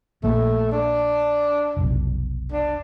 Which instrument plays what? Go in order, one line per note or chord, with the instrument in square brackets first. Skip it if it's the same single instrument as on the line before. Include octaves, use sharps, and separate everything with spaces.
[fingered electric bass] A#1 A#3 [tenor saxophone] A3
[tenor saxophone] D4
[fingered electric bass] F1 B1
[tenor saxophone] D4